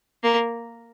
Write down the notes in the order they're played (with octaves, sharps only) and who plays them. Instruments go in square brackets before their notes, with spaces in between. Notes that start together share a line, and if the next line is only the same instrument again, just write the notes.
[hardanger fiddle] A#3